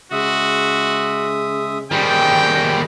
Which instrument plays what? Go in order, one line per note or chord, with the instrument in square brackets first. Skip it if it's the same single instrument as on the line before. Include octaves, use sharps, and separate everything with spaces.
[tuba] C#3 [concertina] G#3 E5 D#6 [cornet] F#4
[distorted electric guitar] D#3 G3 [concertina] G#4 C5 [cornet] G5